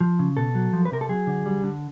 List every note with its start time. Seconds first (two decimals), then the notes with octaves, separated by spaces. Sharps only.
0.01 F3
0.19 C#3
0.37 B2 A4
0.55 F#3
0.73 F3
0.85 B4
0.92 C3 A#4
1.01 A4
1.09 F#3 G#4
1.27 D3
1.46 G3
1.64 D3